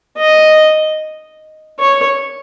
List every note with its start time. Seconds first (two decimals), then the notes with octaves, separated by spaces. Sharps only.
0.18 D#5
1.80 C#5